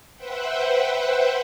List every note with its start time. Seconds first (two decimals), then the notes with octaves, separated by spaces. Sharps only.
0.15 B4 C5 E5 F#5 G5